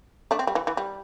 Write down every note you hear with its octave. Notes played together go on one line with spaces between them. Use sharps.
A3 D4
C4
G3
E3
E3
G3